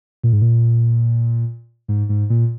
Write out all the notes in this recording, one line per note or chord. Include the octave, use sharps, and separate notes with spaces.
A#2
G#2
A#2
G#2
G#2
A#2